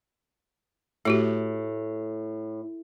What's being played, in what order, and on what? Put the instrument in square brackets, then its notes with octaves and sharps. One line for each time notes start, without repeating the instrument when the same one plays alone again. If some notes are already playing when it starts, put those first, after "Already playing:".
[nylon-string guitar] A2 [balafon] A3 F#4 G4